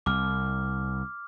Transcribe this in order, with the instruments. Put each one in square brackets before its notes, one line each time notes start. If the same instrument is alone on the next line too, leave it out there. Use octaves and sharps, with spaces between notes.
[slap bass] C2 [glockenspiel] D6 F6